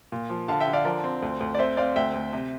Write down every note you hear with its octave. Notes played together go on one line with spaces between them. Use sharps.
A#2
F3
D3 F5 A5
E5 G5
D3
D5 F5
F3 A#4 D5
C4
D2
D2
D5
C4 C5 E5
C4 D5 F5
D2 E5 G5
D2
C3